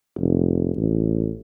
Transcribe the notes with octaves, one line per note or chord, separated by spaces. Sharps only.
F1
A1